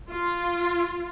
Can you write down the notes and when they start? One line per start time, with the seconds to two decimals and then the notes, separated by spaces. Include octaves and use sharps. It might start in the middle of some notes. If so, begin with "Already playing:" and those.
0.11 F4